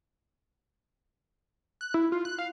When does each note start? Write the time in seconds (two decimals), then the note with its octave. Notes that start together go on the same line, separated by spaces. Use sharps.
1.81 F#6
1.94 E4
2.12 F4
2.25 F#6
2.39 F5